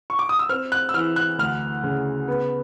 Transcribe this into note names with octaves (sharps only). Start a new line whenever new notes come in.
C#6
D6
D#6
E6
C4 F6
F#6
E6
E3 F6
F#6
D2 F6
C#3
B3